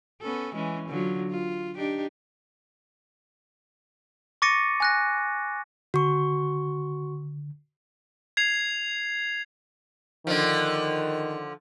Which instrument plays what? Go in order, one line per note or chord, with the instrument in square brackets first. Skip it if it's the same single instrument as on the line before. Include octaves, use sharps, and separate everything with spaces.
[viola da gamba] B3 C#4 A4
E3 G#3 C#4
D3 F#3 F4
F4
D4 D#4 G4
[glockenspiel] C#6 D6 A6 A#6 C#7 D#7
G#5 F#6 A#6
[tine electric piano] D3 [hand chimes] F#4 C#6
[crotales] G#6 C7 F7
[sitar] D3 F3 [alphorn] D#3